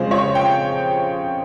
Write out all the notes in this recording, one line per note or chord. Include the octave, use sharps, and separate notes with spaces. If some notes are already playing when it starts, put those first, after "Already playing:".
Already playing: F2 C#3 G#3 C5
C#5
G5